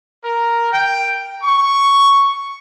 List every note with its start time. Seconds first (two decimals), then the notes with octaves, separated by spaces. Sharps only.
0.23 A#4
0.72 G5
1.43 C#6